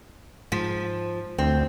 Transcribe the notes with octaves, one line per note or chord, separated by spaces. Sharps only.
G#2 F3
D2 C4